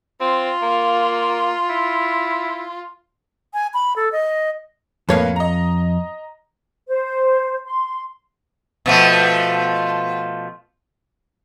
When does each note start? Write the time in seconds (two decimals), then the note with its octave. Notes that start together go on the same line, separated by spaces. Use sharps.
0.21 C4 F4
0.62 A#3
1.69 E4
3.54 G#5
3.74 B5
3.96 A4
4.12 D#5
5.09 F2 A2 A#3 B4 C#5 F5
5.36 D#5 A#5
6.88 C5
7.65 C6
8.86 B2 F3 A3